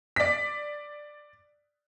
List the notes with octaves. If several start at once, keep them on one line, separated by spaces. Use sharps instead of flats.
D5 B6